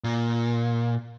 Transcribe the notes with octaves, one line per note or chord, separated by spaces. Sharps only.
A#2